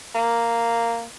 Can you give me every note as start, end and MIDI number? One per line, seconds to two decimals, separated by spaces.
0.15 1.05 58